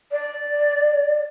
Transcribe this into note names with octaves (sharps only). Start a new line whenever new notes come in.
D5